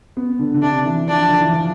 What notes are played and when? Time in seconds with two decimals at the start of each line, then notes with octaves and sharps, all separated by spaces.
0.17 B3
0.39 D3
0.54 D3
0.62 C3 D4
0.85 E3
1.08 F3 D4
1.28 D3
1.41 E3
1.53 F3